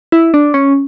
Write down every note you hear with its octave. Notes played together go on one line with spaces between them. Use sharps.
E4
D4
C#4